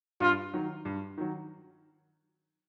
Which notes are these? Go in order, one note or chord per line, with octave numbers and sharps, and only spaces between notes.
G2 F4
D#3 F#3
G2
D#3 F#3